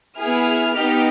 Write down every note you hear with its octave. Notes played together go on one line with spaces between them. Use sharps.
B3 E4 G#4 F6
B3 D#4 G4